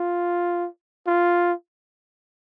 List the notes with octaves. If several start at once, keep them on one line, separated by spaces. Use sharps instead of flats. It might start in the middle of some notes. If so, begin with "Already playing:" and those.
Already playing: F4
F4